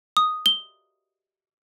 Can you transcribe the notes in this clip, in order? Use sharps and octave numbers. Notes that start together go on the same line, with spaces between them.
D#6
G7